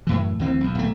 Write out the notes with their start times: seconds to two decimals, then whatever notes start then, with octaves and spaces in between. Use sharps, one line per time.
0.07 F#2 A2 E3
0.39 D2 E3 C4
0.61 B1 E2
0.75 D1 B1 A3